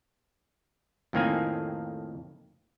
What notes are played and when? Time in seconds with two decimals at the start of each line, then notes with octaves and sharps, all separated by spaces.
1.13 F2 A2 D#3 A#3 C4 G#5